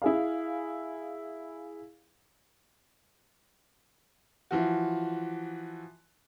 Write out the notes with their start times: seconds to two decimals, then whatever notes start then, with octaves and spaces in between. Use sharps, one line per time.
0.02 E4 G#4 F5
4.51 E3 F3 F#4